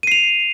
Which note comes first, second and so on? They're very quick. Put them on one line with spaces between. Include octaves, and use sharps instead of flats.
D#7 C7 F7